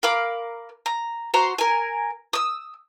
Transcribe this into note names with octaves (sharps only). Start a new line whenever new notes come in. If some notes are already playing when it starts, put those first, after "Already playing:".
A#4 F5 B5 D6
A#5
F#4 C5 A#5 C6
A#4 G#5
D#6 E6